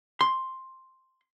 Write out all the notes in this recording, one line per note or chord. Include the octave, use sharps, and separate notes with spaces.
C6